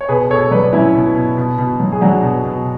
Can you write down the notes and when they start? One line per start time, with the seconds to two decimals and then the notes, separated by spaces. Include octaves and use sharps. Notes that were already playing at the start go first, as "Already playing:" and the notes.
0.01 C#5
0.09 B2 G#4 B4
0.30 B2 A4 C#5
0.51 F#3 B4 D5
0.73 F#3 C#4 E4
0.95 B2
1.15 B2
1.37 B2
1.58 B2
1.80 F#3
1.92 G#4
2.01 F#3 D4 F#4
2.22 B2
2.44 B2